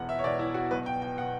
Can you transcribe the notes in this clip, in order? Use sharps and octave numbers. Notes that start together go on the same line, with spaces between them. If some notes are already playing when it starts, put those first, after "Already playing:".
Already playing: E1 E2 B2 F#5
E5
C#5
E1 E2 B2 D5
E4
F#4
B1 B2 B4
G5
G5
F#5
B2